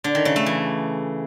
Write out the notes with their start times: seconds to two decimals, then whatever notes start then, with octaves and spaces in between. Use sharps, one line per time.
0.04 D3
0.15 D#3
0.25 C#3
0.36 A3
0.46 E3